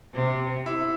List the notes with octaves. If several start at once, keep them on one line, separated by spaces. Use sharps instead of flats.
C3
E4